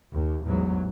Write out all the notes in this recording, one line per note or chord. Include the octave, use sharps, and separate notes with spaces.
D#2
A1 E2 G#2 F#3